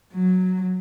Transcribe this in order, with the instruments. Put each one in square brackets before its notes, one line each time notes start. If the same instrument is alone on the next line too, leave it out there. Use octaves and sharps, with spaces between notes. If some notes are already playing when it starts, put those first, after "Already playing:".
[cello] F#3